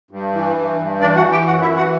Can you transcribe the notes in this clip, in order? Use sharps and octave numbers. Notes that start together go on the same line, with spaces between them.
G2
E3
G2
G2
E3 D4 D5
F#4 F#5
E3
G4 G5
F#2 F#4 F#5
E4 E5
E3
F#4 F#5